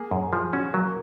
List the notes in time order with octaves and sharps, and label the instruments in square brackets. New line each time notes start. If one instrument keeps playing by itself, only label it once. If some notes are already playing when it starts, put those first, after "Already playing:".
Already playing: [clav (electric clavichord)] A#3 [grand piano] G#4
[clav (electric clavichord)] F#2
[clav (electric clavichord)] F3 [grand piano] G#4
[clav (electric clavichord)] C#4 [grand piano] F#4
[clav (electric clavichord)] F#3 [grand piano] A#3